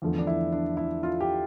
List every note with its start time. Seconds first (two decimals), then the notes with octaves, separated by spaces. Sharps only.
0.02 E2 D3 F3 A3
0.19 D4
0.27 E4
0.52 D4
0.77 E4
1.03 F4
1.21 G4